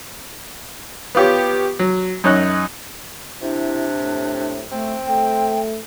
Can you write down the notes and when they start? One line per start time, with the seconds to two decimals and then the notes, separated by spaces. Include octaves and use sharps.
1.15 B3 F4 G4 C#5
1.79 F#3
2.24 F#2 D#4 C#5 D#5 F#6
3.42 C3 D4 E4
3.98 A2
4.72 A3 C4
5.08 A3 G5